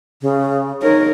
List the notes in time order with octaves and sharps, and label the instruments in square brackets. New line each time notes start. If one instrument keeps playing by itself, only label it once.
[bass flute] C#3
[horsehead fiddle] D#4 A#4 [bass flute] C#5